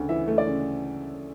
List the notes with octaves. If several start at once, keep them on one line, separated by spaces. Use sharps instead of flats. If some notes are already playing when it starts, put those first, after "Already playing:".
Already playing: D2 C#3
E3 E5
A3
D5
C#3